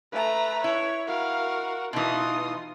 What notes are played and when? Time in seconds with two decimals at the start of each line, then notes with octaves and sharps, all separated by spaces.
0.12 A3 B4 A#5
0.64 E4 C#5
1.07 F#4 A#4 F5
1.93 B2 E3 D#4 F4 C6 D#6